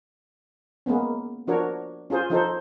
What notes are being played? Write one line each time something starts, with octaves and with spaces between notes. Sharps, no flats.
G#3 A#3 B3 C#4
F3 D4 F#4 A#4 C#5
C#4 F4 G#4 C5
F3 D#4 A4 C5